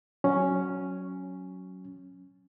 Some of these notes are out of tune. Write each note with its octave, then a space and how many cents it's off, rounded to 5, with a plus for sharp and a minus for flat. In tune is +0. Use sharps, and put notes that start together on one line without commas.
F#3 +0 C#4 +0